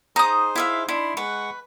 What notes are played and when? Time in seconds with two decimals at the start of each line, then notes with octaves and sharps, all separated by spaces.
0.16 D#4 G#4 C5 A#5 D#6
0.56 E4 E5 F5
0.89 D4 E4 B5 C6
1.17 G#3 B4 F#5 C#6